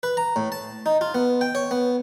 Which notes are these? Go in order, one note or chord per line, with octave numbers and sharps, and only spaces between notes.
B4
A#5
A2
A5
D#4
F4
B3
G5
C#5
B3